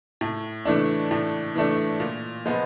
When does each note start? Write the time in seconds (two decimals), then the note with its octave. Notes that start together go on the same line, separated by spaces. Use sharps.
0.21 A2
0.65 E3 A3 D4
1.11 A2
1.56 E3 A3 D4
2.00 A#2
2.46 F3 G#3 B3